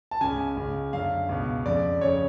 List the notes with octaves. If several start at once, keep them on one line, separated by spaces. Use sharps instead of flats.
A5
C#2 C#3 G#5
C#2 C#3
F#2 D3 F5
C#2 B2
F2 C#3 D5
F2 C#3 C#5